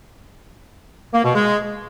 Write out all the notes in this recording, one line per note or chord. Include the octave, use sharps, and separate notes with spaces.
A#3
B2
G#3